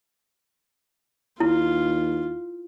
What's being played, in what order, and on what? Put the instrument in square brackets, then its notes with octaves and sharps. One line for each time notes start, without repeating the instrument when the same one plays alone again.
[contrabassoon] D#2 [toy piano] E4 [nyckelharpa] F4